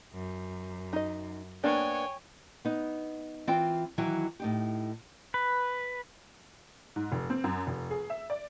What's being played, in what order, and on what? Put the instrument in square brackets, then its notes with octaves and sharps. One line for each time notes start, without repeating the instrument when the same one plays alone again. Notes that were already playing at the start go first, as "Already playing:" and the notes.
[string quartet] F#2
[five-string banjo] D#4 D#5
[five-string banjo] A#3 B3 D4 [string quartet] C#5 G5 G#5
[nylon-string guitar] B3 D#4
E3 C4 F4 G5
D#3 E3 F#3 E4
A2 D#4 G4
[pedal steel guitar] B4
[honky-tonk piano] G#2
F1
C4
F#2
F1
G#4
E5
D5